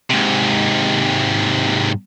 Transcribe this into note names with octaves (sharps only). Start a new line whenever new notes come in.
G#2 C3